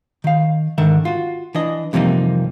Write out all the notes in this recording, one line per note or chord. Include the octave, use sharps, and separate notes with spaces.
D#3 F5
G#2 D3 D#3 E5
F4 F#4
E3 D4 D#5
F2 C3 E3 G3 A#3 D#4